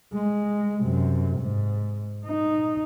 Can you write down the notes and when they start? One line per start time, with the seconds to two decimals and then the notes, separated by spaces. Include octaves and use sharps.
0.14 G#3
0.83 F#2 C3
1.38 G#2
2.26 D#4